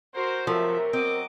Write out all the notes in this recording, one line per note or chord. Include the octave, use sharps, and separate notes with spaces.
F#4 A#4 C5
C3 F3 F#3 A3 A#4 E5
F#3 C4 D#5 D6